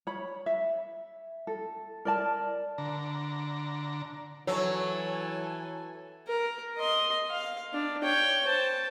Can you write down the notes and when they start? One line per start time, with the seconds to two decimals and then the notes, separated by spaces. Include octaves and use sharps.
0.07 C#5 B5
0.46 E5
1.47 A4
2.05 A#4 D5 A5
2.78 D3 A#5
4.47 E3 F#3 A4 C#5 G#5
6.27 A#4
6.78 D#5 C6
7.30 F5
7.73 D4
8.03 C#5 G5
8.47 C5 A5